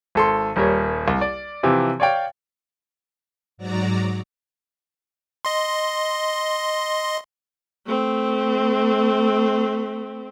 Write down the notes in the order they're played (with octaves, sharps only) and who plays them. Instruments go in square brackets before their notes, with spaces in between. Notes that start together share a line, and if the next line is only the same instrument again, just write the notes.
[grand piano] G#1 A4 C6
D#1 G3 A#4 C#5
C2
D5
C3 E3 F3 G4
C#5 D5 F5 G5
[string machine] G#2 F#3 F#4 D5 A#5
[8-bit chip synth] D#5 C6
[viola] A3 C4